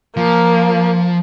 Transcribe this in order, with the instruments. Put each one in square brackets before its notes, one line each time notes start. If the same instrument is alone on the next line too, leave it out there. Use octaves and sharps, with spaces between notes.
[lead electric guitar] F3 [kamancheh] A#3